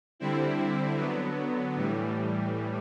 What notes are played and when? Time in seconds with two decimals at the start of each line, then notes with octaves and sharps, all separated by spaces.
0.20 D3 G3 C4 E4
0.97 D3 F#3 B3
1.75 A2 E3 G3